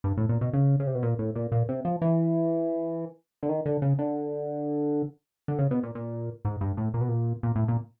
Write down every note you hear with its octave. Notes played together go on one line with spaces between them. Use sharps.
G2
A2
A#2
B2
C#3
C#3
C3
B2
A#2
A2
A#2
A#2
C3
F3
E3
D3
D#3
D3
C#3
D3
D3
C#3
B2
A#2
A#2
G#2
G2
A2
A#2
B2
A#2
A#2
A2
A#2